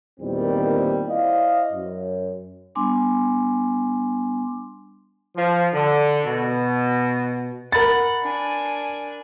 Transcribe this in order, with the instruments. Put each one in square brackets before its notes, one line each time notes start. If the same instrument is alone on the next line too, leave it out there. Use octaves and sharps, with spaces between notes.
[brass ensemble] E2 A#2 D#3 G3 C4
E4 C5 D5 D#5 F5
F#2
[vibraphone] G3 B3 D4 G#5 C6 D6
[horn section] F3
D3
B2
[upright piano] A#4 B5 [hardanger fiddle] F#5 [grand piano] A6
[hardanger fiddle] D4 G#5